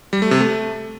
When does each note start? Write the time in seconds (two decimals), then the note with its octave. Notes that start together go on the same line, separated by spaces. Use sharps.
0.13 G3
0.22 A3
0.31 C3
0.40 A3